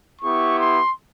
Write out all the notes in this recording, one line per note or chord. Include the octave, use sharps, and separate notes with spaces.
B3 E4 G4 C#6
C6